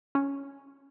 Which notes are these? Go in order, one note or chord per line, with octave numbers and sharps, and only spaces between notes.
C#4